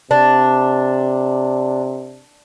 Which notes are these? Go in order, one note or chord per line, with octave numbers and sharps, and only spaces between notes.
C3 D4